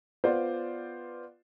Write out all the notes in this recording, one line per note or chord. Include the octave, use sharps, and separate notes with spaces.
B3 F4 C5 D5